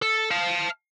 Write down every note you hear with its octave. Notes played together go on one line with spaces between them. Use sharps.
A4
F5 A5